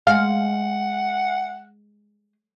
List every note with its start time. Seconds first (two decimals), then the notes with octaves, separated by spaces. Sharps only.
0.07 G#3 F5 F#5